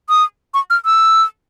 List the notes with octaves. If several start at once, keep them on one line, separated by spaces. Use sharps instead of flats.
D#6
C#6
F6
E6